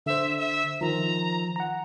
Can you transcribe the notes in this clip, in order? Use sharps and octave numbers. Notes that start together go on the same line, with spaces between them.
D3 C5 E5
E5
D#3 F3 A#5
F#5 A#5